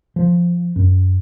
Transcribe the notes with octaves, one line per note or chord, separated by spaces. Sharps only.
F3
F#2